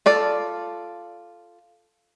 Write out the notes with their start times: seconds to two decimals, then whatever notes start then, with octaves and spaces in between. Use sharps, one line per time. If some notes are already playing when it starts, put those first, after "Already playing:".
0.06 F4 A4 D5